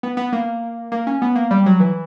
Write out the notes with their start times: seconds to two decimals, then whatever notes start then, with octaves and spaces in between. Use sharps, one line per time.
0.03 B3
0.17 B3
0.32 A#3
0.92 A#3
1.07 C#4
1.22 B3
1.35 A#3
1.51 G3
1.66 F#3
1.80 E3